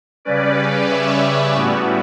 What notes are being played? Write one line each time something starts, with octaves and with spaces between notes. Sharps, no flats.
C#3 G3 C#4 B4 D5
C#5 E5
A2 G3 B3 F#4